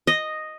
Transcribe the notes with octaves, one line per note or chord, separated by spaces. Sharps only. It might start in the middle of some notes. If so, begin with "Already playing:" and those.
D#5